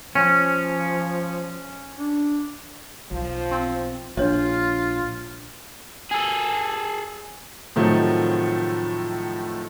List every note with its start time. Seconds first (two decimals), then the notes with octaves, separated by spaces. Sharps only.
0.15 F3 C#4
1.97 D4
3.11 B1 F3
3.51 C4
4.17 A#1 D4 F4 C#5 D#5
6.11 G#4 A4
7.76 A2 C3 D#3 F3 F#3 A3